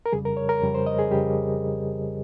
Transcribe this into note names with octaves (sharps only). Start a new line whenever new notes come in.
A#4
F2 C#3 G3 G#4
A#4
C#5
A#4
F2 C#3 G3
C5
D#5
G#4
F2 C#3 G3 G4